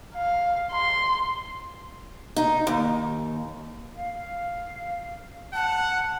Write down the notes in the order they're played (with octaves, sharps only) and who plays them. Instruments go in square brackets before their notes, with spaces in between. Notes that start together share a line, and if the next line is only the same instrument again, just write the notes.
[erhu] F5
C6
[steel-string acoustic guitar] D#4
D#2
[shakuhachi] F5
[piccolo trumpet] F#5 [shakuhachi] A5